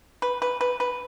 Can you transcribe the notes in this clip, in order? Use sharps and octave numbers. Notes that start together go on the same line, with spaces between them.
B4
B4
B4
B4